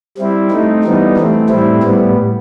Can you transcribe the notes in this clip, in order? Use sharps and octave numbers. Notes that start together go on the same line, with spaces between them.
G3 C4 E4
A3 C4 D#4
E3 G3 B3 D#4
E3 A3 C4
A2 G3 C4 E4
A2 G3 B3